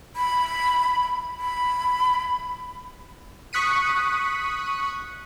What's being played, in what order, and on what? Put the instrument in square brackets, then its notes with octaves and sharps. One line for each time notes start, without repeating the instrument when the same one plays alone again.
[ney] B5
B5
[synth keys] C#6 D#6 F#6 B6 C#7 D#7